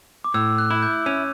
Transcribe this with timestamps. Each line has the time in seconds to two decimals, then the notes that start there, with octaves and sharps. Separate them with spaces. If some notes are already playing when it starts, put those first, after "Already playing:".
0.24 D6
0.34 A2 E6
0.58 F#6
0.70 E4
0.82 G6
1.06 C#4